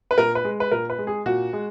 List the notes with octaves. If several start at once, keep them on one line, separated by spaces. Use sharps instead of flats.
B4
A#2 A#4
B4
G#3
B4
A#2 A#4
B4
G#3
G#4
A#2 F#4
G#3